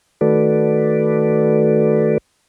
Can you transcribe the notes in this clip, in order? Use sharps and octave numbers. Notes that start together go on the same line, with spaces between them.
D#3 A3 F#4 A4 B4 D5